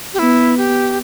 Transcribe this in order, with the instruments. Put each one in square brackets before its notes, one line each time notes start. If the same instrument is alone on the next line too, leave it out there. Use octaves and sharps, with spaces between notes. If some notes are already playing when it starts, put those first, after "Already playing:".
[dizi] G4
[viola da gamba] B3 [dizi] E4
[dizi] G4